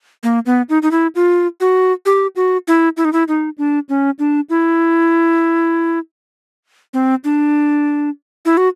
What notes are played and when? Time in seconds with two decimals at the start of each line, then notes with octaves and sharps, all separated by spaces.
0.23 A#3
0.46 B3
0.69 D#4
0.82 D#4
0.91 E4
1.15 F4
1.61 F#4
2.06 G4
2.36 F#4
2.68 E4
2.97 E4
3.05 D#4
3.13 E4
3.28 D#4
3.58 D4
3.89 C#4
4.19 D4
4.50 E4
6.94 C4
7.24 D4
8.45 E4
8.57 F#4